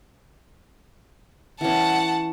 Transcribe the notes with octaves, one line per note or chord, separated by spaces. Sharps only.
E3 C#4 F#5 A5